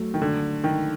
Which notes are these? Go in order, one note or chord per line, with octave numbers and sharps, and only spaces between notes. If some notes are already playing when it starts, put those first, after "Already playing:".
Already playing: F#3 A3
D#3
D3
D#3